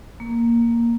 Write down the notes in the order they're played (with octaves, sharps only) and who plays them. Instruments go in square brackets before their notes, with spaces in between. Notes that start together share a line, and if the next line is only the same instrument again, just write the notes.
[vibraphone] A#3